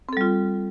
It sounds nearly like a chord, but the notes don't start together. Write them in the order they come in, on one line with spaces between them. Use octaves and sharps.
C4 A4 G3 F4